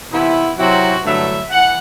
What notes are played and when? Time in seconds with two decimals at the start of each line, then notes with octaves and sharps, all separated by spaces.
0.12 C3 E3 B3 E4
0.58 C3 F#3 C4 E4 F#4
1.04 G2 D3 F#3 A3 E4 E5
1.50 E3 F#5